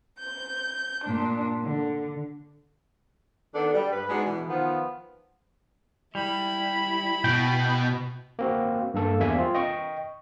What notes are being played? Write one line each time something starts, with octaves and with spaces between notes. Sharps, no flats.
G6
A#2 D4
D3
D#3 B3 D4 A4
G3
G2 B4
G#3 B3 D4 D#4 F#4
B2 E3
D#3 F3 B3 F4
G3 E4 B5
B2 G5
A#3 C4 F#4
G2 A#3 A4
E2 G3 A#3 E5 G#5
C4 F4
D#5 G5 C#6